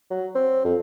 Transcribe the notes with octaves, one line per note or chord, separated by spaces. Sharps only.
F#3
C4
F2